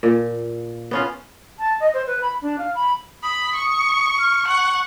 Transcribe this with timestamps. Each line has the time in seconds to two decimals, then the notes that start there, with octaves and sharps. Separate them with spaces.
0.03 A#2
0.91 B3 C#4 F4
1.59 A5
1.80 D#5
1.94 C5
2.07 B4
2.21 B5
2.41 D4
2.58 F5
2.75 B5
3.23 B5 D#6
3.55 C#6
4.19 F6
4.48 F#5 C#6